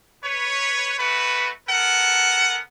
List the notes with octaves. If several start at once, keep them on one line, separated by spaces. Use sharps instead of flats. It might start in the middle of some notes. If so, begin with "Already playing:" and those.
B4 C#5
A3 F#4 B4
B3 A4 A#4 F#5